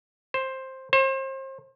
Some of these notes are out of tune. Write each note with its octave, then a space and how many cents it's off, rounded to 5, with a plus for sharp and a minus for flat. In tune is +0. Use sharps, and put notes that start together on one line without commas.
C5 +10
C5 +35